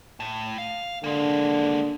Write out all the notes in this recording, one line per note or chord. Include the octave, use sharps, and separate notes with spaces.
A2
F5
D3 G#3 A#3